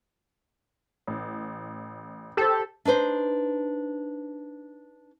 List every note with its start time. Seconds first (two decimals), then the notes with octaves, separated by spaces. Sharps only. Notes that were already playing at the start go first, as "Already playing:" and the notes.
1.07 A1
2.37 G4 A4 C5
2.85 D4 D#4 B4 C5